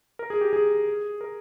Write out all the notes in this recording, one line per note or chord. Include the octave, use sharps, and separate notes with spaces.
A#4
G#4
G4
G#4
A#4